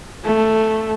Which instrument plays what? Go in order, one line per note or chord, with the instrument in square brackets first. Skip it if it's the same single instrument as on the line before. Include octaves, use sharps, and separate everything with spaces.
[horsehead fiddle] A3